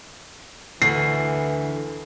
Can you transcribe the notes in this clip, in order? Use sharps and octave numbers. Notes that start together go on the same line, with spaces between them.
D2 D3 E3 C7